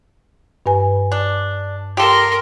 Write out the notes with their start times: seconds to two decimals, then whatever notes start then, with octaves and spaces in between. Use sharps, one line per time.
0.66 G2 B4 G#5
1.11 D4
1.97 G4 A4 A#4 C6